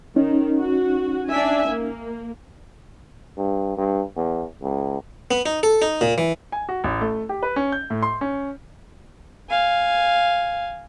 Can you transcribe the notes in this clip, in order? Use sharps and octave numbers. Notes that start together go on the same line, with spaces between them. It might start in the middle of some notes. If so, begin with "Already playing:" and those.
D#3 C#4 D#4
F#4
D4 E5 G#5
A#3
G2
G2
E2
C#2
B3
D#4
A4
D#4
A#2
E3
G#5
F#4
A1
A3
G4
B4
C#4
G6
A2
C6
C#4
F5 G#5